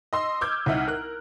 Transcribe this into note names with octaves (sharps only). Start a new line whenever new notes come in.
D#5 C6 E6
D6 E6 F6 G6 G#6
C2 D#4 E5 F#5 F6
A#4 F#6